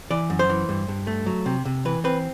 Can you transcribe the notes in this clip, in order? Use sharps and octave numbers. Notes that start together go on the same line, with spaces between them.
E3 D5
F#2
C5
E3
G2
G2
A3
F#3
C3
C3
E3 B4
C4 B4